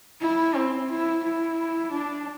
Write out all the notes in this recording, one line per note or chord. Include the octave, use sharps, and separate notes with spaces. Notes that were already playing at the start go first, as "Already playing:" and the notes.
E4
C4
E4
E4
D4